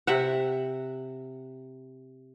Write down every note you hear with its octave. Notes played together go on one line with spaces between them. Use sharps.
C3 E5 F#5